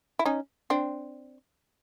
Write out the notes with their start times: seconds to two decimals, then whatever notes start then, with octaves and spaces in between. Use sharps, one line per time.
0.19 E4
0.25 C#4 D#4
0.70 C4 D4